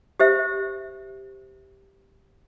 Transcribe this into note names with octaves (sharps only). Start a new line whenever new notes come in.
G4 C5 E5